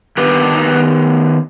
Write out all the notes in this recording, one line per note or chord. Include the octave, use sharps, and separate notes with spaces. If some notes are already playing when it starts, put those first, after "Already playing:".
D#3 B3 G4 B4
D4
D#4